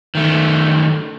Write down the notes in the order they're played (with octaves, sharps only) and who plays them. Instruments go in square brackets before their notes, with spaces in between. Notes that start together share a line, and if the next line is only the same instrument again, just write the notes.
[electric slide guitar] D#3 A3